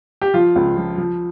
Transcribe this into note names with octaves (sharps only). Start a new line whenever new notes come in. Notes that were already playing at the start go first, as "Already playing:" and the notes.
G4
F3 F4
C#2
F3
F3